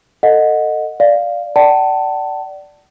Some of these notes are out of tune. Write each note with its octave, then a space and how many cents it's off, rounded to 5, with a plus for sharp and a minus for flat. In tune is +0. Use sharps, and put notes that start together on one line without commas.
A4 +25 D#5 -5 F#5 -15
D5 +0 F5 +0
D5 +0 F#5 +45 A5 +10